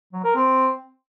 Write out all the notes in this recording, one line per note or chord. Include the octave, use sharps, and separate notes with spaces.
F#3
A#4
C4